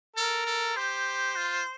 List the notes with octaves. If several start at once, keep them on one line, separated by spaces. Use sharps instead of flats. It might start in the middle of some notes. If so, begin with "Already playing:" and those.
A4 A#4
A4
G4 C5
F4